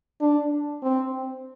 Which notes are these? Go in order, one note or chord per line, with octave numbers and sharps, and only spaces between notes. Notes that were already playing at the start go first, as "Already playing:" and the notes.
D4
C4